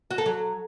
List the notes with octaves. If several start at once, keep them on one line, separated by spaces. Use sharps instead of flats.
F#4
A4
F#3